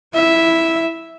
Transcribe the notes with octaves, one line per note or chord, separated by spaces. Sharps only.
E4 E5